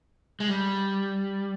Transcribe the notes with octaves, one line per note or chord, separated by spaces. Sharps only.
G#3
G3